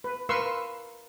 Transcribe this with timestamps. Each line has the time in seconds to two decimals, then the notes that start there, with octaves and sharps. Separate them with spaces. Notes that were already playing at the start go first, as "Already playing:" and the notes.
0.04 B4
0.29 A#4 B4 F5 C6 C#6 E6